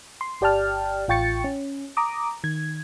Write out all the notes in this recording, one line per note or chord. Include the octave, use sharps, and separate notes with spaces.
C6
G1 G4 D5 G5 A5 F6
A1 F4 G5 C#6 A6 C#7
C#4
A#5 D6 D#6
D#3 G#6